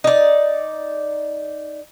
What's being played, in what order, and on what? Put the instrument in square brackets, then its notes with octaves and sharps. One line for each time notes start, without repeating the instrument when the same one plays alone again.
[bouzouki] D#4 D5